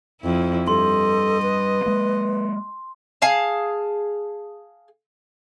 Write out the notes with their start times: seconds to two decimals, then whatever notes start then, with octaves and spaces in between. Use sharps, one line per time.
0.21 F2 E4
0.68 G2 A4 D#5 C6
1.42 B4
1.86 G#3 A#3
3.22 G#4 F5 A5